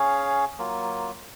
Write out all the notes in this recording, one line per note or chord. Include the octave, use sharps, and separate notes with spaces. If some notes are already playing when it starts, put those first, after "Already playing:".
Already playing: C#4 G#4 C#5 F5
F#3 A#3 F4